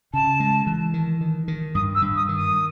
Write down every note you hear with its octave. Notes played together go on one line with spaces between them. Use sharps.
C#3 A5
G#3
E3
D#3
D#3
D#3
G2 D#6
E6
G2
D#6
D#3
D#6